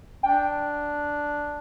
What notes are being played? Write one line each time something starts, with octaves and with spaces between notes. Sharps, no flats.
D4 G5